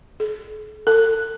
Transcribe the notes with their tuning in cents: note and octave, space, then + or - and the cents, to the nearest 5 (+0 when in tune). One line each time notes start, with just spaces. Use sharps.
A4 -45
A4 +35